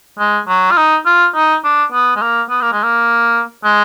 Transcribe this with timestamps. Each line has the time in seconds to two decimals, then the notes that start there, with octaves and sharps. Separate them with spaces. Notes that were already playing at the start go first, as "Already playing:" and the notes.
0.19 G#3
0.48 F#3
0.71 F4
0.77 D#4
1.06 F4
1.35 D#4
1.64 D4
1.92 B3
2.16 G#3
2.22 A#3
2.50 B3
2.62 A#3
2.72 G#3
2.83 A#3
3.65 G#3